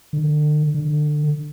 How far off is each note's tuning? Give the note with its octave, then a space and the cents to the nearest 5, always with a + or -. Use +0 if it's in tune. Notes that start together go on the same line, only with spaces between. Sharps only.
D3 +40
D3 +25